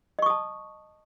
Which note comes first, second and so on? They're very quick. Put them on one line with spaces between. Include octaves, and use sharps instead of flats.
D#5 C#6 D#6 A5